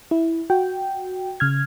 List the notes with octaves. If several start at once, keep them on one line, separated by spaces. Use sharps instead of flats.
E4
F#4 G5
C#3 F6 G#6